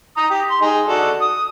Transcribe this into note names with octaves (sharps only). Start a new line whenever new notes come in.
A#5 D#6
G4
C6
D#4 G#4
F#4 A4 D5
D#6